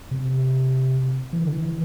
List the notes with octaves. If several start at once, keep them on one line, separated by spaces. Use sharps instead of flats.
C3
E3
D3
E3